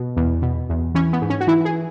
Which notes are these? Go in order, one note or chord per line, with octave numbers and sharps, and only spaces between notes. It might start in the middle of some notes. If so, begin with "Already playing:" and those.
Already playing: B2
E2
B2
E2
E3 C#4
B3
G#2
C#4
F#4
E3 E4
G#4